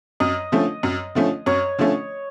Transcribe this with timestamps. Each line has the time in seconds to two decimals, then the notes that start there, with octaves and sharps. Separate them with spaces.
0.20 F#2 D#5
0.52 D3 F3 A3 C#4
0.83 F#2
1.15 D3 F3 A3 C#4
1.46 F#2 C#5
1.78 D3 F3 A3 C#4